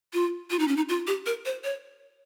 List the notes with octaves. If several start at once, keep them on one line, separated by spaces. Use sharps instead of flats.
F4
F4
D#4
C#4
D#4
F4
G4
A#4
C5
C#5